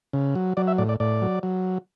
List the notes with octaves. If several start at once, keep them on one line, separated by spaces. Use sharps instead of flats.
C#3
F#3
F#3 D5
E5
A2 D5
D5
A2 D5
F#3
F#3